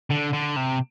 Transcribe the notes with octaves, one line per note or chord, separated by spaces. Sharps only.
D3
D3
C3